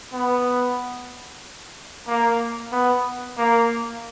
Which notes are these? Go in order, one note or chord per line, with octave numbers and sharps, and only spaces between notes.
B3
A#3
B3
A#3